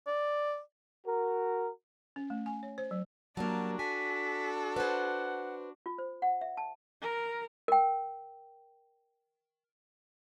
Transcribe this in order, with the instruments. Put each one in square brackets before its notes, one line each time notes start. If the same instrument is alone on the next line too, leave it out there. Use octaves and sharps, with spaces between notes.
[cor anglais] D5
[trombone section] F#4 A#4
[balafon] C#4
A3
G#5
C#5
C5
F#3
[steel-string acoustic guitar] F#3 G3 A#3 [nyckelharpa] D4 F#4 [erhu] A5
[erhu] A4 [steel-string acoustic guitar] G#5 [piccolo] B6
[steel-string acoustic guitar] B4 C5 [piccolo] F#5
[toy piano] F4
C5
F#5
E5
A5
[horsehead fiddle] A#4
[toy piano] A#4 G5